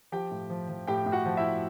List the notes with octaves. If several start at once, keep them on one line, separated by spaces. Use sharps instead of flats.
F3 G4 G5
A2
F3
F3
A2 G4 G5
A2
F#4 F#5
F3
E4 E5
F3